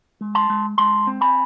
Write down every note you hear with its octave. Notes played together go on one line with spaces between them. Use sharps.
G#3
A5 C6
G#3
G#3 A5 C6
C4
G#5 B5